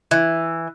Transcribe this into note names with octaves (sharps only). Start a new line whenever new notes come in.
E3